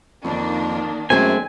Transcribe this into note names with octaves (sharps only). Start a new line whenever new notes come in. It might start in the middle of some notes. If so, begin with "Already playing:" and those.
F2 D#3 A#3 D4
F#2 G#3 A3 C4 G#5